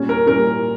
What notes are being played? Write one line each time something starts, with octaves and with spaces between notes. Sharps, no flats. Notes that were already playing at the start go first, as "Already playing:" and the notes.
Already playing: A#2 G3 C#4
A#4
A#2 G3 C#4 A#4